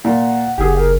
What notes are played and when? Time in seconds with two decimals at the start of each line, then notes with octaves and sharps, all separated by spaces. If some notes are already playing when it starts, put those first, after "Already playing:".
0.05 A#2 F#5
0.58 F#1 G4 G#4
0.77 A#4